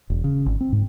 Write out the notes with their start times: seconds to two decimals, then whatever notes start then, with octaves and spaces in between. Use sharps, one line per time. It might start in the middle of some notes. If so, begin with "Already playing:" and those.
0.10 E1
0.24 C#3
0.46 G#1
0.61 C4
0.72 G#2